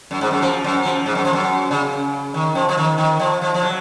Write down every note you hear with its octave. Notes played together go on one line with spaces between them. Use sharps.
F#2
G#2
F#2
F3
F#2
F3
G#2
F#2
F3
F#2
C#3
D#3
F3
F3
D#3
D#3
F3
F3
F3
F#3